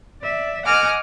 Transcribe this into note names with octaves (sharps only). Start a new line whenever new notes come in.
D5 E5
D#5 F#5 G#5 D6 F6